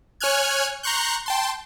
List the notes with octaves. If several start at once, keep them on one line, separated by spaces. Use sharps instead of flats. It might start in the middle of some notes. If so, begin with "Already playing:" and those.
C#5 G#5 F6 F#6 G#6
A#5 C6 C#6 F#6 G6
G5 A5 C6